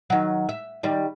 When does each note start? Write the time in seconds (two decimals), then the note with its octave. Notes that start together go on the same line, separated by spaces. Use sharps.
0.10 D#3 F#3
0.49 E5
0.83 D#3 G3